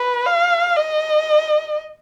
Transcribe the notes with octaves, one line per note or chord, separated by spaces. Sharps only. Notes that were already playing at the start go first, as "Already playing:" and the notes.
Already playing: B4
F5
D#5